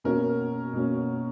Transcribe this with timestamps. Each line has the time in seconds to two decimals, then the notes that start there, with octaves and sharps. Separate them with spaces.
0.04 B2 A#3 C#4 A#4
0.73 B2 A#3 C#4